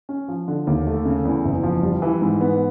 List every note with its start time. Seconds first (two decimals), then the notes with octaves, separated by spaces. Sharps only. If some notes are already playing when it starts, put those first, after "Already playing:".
0.09 C#4
0.28 F3
0.48 D3
0.67 D#2
0.87 A3
1.05 C#3
1.25 E2
1.45 F#1
1.63 F3
1.83 G3
2.02 E3
2.22 G#2
2.41 B3